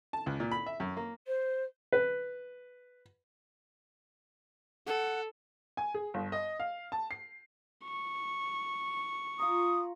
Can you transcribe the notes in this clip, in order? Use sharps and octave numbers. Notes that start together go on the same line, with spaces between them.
A5
C#2
A#2
B5
E5
F#2
A#3
C5
B4
A4 F#5
G#5
G#4
G1
D#5
F5
A5
C7
C#6
F4 A#5 D#6